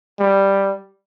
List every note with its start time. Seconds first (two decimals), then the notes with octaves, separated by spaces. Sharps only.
0.19 G3